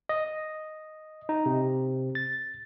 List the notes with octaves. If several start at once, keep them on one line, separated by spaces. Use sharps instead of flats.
D#5
D#4
C3
A6